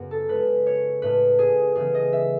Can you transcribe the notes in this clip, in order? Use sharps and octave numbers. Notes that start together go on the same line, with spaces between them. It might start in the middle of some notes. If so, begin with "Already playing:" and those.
Already playing: F#2 C#3 B3 C#4 F#4
A4
C#3 G#3 C#4 B4
C#5
A2 G#3 C#4 B4
G#4
C#3 E3 B3 G#4
D#5
E5